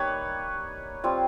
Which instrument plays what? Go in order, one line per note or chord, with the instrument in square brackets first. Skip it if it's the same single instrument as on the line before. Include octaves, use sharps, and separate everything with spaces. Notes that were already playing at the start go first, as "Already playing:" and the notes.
Already playing: [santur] G3 A#3 D#4 B4 C#5
G3 C4 F4